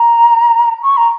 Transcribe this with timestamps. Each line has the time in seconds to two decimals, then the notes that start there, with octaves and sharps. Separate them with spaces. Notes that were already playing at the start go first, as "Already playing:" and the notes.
Already playing: A#5
0.83 C#6
0.97 A#5